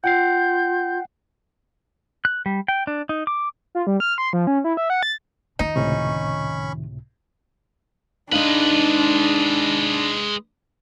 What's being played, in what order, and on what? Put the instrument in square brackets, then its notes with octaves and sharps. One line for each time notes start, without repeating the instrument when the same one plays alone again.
[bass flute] F4 [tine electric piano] F#5 G5 C7 [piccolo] G6
[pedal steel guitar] F#6
G3
G5
D4
D#4
D6
[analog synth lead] F4
G3
F6
C6
F3
C#4
E4
E5
F#5
A6
[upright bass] F2 D#3 [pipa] D#4
[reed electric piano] C#2 A2 C3 [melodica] C#4 B5 C#6
[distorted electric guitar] G#3 B4 [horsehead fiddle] D4 [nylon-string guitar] D#4 F5